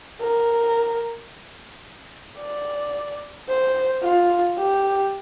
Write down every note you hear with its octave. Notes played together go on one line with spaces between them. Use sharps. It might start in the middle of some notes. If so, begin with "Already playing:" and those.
A#4
D5
C5
F4
G4